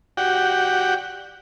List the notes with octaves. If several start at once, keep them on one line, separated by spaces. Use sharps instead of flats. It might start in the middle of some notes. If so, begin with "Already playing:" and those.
F#4 G4 D5 F#5 G5